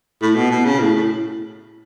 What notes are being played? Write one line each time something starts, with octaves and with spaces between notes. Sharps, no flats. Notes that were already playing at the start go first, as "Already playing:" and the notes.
A2
B2
B2
C#3
A2
A2